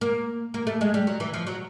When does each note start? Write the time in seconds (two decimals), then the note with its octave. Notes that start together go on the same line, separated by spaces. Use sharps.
0.01 A#3
0.54 A#3
0.67 A3
0.81 G#3
0.94 G3
1.07 F#3
1.20 E3
1.34 F3
1.47 F#3